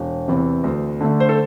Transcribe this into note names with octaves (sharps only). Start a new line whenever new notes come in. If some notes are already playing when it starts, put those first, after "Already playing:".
Already playing: E1
E2 C3
D2
D3 A3
C5
A4